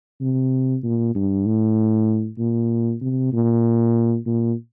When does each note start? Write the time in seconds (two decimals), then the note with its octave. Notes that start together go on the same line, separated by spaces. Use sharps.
0.21 C3
0.83 A#2
1.15 G2
1.46 A2
2.38 A#2
3.01 C3
3.33 A#2
4.26 A#2